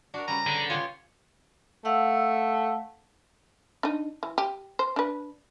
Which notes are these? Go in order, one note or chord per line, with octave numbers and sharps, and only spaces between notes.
D4 F#4 A#4
C#3 G3 B4 A#5
D3
F4 G4 G#4 C#5
A3 F5 F#5 E6
D4 D#4
E3
G4
C5
D4 B4